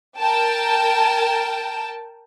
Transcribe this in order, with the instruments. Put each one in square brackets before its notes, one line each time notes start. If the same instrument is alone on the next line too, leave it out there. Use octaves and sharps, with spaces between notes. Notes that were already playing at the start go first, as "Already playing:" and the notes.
[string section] A#4 G5 A5